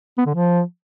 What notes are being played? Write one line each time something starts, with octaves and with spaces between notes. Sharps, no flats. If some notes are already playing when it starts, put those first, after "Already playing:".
B3
D3
F3